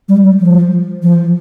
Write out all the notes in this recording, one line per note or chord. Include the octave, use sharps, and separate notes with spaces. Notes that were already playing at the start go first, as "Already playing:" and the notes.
G3
G3
F3
F3